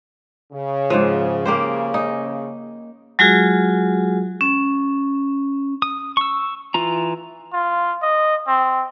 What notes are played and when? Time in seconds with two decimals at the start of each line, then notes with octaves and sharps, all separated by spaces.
0.53 C#3
0.90 G#2 F3
1.45 A#3 G4 C5
1.94 D#4
3.19 F#3 G#3 F4 F#4 G#4
4.41 C#4
5.82 D#6
6.17 C#6 E6
6.74 E3 F4 A#5
7.53 F4
8.02 D#5
8.47 C4